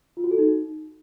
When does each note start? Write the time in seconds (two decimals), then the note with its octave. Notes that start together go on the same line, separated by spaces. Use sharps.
0.17 F4
0.24 F#4
0.31 A4
0.38 D#4